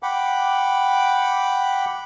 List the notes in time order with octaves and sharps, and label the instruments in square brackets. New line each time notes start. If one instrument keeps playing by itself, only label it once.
[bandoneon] F#5 G5 B5 D6